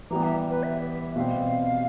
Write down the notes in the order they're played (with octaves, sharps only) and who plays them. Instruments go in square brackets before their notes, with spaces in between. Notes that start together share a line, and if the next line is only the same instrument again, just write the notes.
[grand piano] E3 G3 B3 [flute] A#5
[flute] E5
B4
E5
[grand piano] B2 G3 C4 [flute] F5